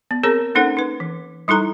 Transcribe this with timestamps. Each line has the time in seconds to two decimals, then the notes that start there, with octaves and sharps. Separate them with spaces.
0.11 B3
0.23 C4 G#4 A#4 C#5 A#5
0.55 A#3 C#4 D#4 A4 C5 F#5
0.77 D#4 B4
1.00 E3
1.48 G3 D#4 E4 A4 A#5